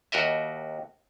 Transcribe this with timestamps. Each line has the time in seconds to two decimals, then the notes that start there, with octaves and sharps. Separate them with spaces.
0.12 D#2 F#4 A#4 D#5 E5